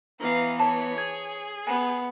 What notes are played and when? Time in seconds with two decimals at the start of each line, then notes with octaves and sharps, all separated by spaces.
0.20 E3 B3 F5 A#5
0.60 C#5 A5
0.98 G#4 G#6
1.67 B3 G#5